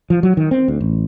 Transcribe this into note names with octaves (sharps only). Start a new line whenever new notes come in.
F3
F#3
D#3
C4
D2
A1